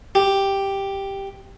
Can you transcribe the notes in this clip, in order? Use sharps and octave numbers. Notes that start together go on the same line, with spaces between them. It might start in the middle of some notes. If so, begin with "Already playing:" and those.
G4